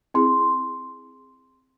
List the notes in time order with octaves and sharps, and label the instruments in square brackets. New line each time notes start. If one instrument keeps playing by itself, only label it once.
[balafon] C4 E4 G#4 [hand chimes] C6